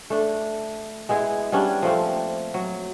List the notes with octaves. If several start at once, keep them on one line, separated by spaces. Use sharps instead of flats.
A3 D4
G#3 B3 E4 G#4
G3 B3 C#4 D4
F3 A3 A#3 C4
F#3